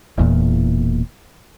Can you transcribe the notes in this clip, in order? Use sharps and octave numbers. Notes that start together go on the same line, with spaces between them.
E1 E2 A#2